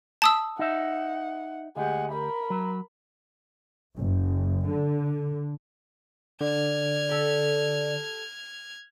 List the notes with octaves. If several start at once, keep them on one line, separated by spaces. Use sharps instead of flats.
A5 D#6 E6
D#4 E5 F#5
D2 G#3 G4 F#5
A#4 B5
F#3
F#1
D3
D3 D5 F6 G#6
G4 A4